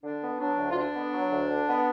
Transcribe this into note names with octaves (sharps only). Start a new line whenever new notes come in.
D3 D4
B3
F#3 D4
D2
F4
D3 D4
B3
F#3
D2
D3
B3